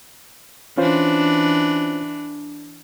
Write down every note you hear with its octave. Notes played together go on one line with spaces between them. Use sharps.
E3 C#4 D4 F4 C5